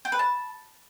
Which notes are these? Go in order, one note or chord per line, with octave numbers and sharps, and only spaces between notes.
G5
B4
A5